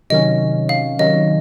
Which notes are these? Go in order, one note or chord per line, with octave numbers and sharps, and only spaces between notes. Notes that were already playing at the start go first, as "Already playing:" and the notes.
C3 D#3 F#3 C#4 D#5
F5
C3 D#3 F#3 C#4 D#5